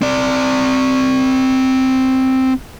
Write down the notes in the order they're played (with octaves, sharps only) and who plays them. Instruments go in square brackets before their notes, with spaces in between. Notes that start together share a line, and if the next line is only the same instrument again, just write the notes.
[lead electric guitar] C4 D5